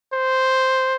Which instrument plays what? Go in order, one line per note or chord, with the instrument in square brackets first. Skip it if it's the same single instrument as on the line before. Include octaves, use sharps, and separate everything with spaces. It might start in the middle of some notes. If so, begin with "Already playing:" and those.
[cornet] C5